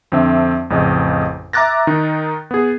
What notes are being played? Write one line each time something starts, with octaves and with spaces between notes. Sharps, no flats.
F2 D3 C4 E5
A1 F2 C#3 D#5
E5 A#5 D6 F#6 A6 A#6
D#3 D#4
B3 G#4